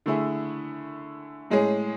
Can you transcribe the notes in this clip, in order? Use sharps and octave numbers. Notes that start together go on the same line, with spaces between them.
D3 A3 E4 G#4
A2 G#3 C#4 G#4